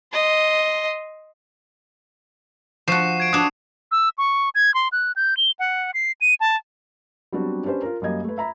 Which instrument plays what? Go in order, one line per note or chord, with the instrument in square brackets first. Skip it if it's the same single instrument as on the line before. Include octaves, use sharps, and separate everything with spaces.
[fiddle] D#5 C6
[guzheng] F3 F#4 [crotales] C#6 C7 E7
[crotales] G#6 D7
[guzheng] D4 F#4 [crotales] D#6 E7
[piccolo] E6
C#6
G#6
C6
F#6
G6
G7
F#5
C7
D#7
A5
[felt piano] F#3 G3 B3 C4 D4 F#4
C#4 D4 G4 B4 C5
F4 A#4
F#2 G3 A#3 D#5 G#6
A3 B4
E5 A#5 B5